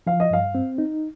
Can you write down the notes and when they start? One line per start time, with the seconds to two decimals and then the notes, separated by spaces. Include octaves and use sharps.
0.07 F3 F5
0.20 D#5
0.30 G2 F5
0.55 C4
0.78 D#4